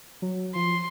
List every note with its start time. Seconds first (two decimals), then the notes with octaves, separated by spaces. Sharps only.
0.22 F#3
0.55 F3 C6